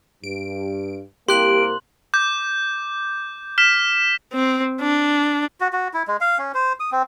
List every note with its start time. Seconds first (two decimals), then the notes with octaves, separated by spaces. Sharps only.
0.24 G2 D7
1.28 C2 A#3 G4 C6 F#6 D7 F#7
2.14 D6 G6
3.58 F6 B6 E7
4.33 C4
4.81 D4
5.60 F#4
5.73 F#4
5.94 E4
6.08 G#3
6.21 F5
6.38 C#4
6.54 C5
6.80 D#6
6.92 C4